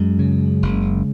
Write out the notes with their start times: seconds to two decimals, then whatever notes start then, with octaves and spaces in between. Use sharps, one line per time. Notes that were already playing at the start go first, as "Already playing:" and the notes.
Already playing: F#2 G#3
0.19 C#3
0.62 F#1